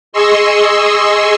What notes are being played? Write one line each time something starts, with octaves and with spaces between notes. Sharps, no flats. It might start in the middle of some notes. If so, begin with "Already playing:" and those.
G#4 D#5 C6 C#6 E6